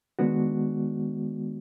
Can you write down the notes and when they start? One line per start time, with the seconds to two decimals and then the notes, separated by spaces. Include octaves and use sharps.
0.19 D#3 G#3 B3 D4 F#4